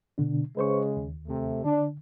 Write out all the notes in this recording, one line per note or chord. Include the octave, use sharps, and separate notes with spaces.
B2 D3 D4
C#3 G#3 B4 C5 C#6
D#2
C3 A3
D3 D4